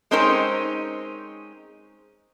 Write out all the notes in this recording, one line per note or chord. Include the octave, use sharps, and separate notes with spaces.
G#3 C4 C#4 D#4 A#4 C5